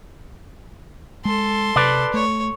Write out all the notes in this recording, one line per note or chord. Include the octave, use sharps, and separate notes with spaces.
G#3 A4 C6
C3 B4 D5
A3 C#5